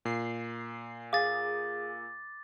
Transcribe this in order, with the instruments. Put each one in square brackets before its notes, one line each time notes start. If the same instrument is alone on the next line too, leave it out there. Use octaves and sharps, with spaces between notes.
[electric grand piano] A#2 [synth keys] C7
[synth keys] G#4 [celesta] F5 [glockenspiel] D6 A6